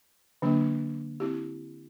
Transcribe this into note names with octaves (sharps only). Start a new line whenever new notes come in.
D3 F#3 A#3 D4
C4 E4 G4